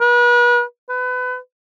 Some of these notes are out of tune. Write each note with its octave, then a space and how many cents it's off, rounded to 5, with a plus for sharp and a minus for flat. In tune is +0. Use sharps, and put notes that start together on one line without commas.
B4 -35
B4 +30